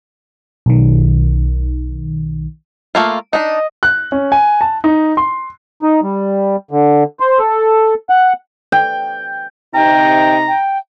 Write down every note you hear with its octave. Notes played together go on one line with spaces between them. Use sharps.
B1 D#3
A3 A#3 F4
D4 D#4 D#5
F#6
C#4
G#5
A5
D#4
C6
D#4
G3
D3
C5
A4
F#5
G5
C3 D#4 G5 A#5
G5